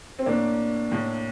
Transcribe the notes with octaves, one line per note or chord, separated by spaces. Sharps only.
C4
A2 A#3 D4
A2